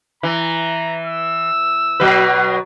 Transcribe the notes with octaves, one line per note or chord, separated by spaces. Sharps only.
E3 A#5
E6
B2 F#3 B4